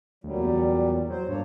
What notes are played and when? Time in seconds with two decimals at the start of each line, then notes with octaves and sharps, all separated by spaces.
0.24 D2 A#2 F#3 G3
0.37 E2
1.10 F#3 C5
1.29 G2 A#3 D4 C#5